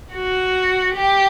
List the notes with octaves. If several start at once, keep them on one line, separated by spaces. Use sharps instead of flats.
F#4
G4